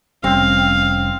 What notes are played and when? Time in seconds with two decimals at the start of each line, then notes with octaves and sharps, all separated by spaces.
0.24 F1 G3 C4 C#4 F5